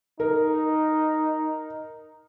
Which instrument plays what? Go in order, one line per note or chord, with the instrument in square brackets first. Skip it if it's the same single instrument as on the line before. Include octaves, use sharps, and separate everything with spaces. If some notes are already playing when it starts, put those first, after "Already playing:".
[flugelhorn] D#4 [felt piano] A#4